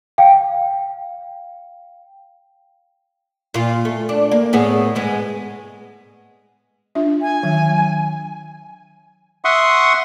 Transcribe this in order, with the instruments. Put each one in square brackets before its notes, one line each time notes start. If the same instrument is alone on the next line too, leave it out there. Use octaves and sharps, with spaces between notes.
[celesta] F5 G5
[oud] A#2 F4
A3
D4
A#3
A2 B3 G#4
G#2 G#3 B3
[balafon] D4 F4 E5
[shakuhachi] G#5
[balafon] D#3 F#3
[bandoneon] E5 F#5 C6 C#6 D#6